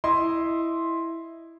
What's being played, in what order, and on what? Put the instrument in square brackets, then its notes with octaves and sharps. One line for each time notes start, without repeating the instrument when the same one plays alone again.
[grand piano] E4 D#5 C6